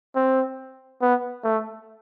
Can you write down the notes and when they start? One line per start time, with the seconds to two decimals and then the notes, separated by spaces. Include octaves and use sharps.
0.15 C4
1.01 B3
1.44 A3